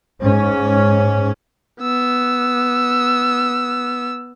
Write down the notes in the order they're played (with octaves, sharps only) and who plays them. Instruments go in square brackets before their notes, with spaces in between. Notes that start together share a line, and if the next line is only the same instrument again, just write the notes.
[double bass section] G#2 C#4
[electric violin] B3 E6